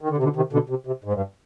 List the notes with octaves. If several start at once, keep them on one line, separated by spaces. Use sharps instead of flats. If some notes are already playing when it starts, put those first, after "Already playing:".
D#3
D3
C3
B2 D3
C3 D#3
B2 D3
C3
C3
G#2
G2